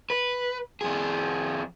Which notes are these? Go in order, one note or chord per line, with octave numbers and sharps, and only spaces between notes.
B4
F2 G#4